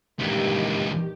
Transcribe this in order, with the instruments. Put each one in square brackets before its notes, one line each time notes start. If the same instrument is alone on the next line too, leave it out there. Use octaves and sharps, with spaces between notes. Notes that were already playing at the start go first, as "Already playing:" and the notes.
[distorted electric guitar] C#2 E3 [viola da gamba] G2 A#2 D#3 [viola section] G4